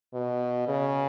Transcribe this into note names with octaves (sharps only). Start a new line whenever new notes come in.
B2
C#3